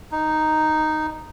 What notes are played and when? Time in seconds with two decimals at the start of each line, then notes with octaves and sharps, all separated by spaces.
0.12 D#4